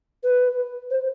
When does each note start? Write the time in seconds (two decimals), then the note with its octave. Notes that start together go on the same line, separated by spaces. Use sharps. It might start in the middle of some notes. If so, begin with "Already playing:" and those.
0.23 B4
0.90 C5